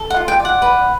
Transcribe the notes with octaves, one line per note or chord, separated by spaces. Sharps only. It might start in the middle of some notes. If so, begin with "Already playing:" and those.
Already playing: A4
F#5
F4
G5
D5
F#5
B4